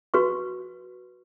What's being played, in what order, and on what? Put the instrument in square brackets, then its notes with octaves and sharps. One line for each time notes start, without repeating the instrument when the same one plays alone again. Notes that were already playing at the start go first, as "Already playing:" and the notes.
[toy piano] F#4 B4 C6 C#6